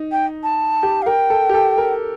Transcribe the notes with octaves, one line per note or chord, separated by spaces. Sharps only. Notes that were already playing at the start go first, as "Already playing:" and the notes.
Already playing: D#4
G5
A5
G4
F5
A#4 G5
A4
G4
A4
A#4